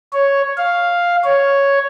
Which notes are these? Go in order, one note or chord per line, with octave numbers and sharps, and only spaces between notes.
C#5
F5
C#5